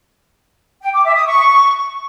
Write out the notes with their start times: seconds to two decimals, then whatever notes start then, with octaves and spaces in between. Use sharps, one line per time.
0.82 G5
0.93 D6
1.04 E5
1.15 D#6
1.26 C#6